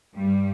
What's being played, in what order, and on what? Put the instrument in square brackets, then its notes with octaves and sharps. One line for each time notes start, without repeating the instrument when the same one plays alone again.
[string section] G2 G3